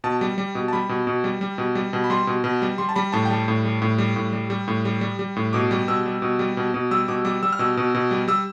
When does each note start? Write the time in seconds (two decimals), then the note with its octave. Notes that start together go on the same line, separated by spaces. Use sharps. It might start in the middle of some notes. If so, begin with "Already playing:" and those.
0.04 B2 A5
0.21 G3
0.38 G3
0.55 B2
0.68 A5
0.73 G3 B5
0.89 B2
1.07 B2
1.24 G3
1.41 G3
1.58 B2
1.75 G3
1.93 B2
2.04 B5
2.10 G3 C6
2.27 B2
2.44 B2
2.62 G3
2.78 G3 C6
2.89 A5
2.96 G3 B5
3.12 A2 A5
3.25 G5
3.30 G3 A5
3.48 A2
3.65 G3
3.82 A2
3.98 G3
4.16 A2
4.33 G3
4.50 G3
4.68 A2
4.85 G3
5.01 G3
5.19 G3
5.36 A2
5.53 B2 D6
5.71 G3
5.88 B2 E6
6.06 G3
6.22 B2
6.39 G3
6.57 B2
6.74 B2
6.91 G3 E6
7.08 B2 D6
7.25 G3 D6
7.43 G3 E6
7.52 F6
7.59 B2 E6
7.77 B2
7.95 B2
8.11 G3
8.28 G3 E6